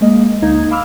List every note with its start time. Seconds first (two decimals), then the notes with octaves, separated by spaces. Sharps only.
0.01 G#3 A#3 D#5
0.42 D2 A#3 D#4 G#6
0.71 F5 B5 D6 E6 F6